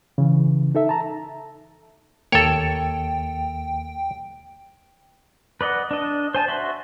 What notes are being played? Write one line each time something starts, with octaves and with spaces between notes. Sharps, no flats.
C#3 E3
D#4 A4 E5
A5 A#5
D#2 A#3 A4 C#5 G5
B4 D5 D#5 F#5
D4 D#5
C5 G#5 A5
F#4 E5 C6